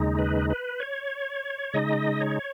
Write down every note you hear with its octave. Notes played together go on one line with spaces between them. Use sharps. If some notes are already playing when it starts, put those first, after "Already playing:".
Already playing: D#2 C#3 G#3 D#4
B4
B4
C#5
C#3 G#3 D#4 D#5
C#5